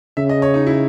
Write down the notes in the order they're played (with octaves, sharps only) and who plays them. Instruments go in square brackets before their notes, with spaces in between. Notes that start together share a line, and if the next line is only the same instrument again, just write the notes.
[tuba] C#3 [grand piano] E5
[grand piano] D#5
C#5
D#4
E4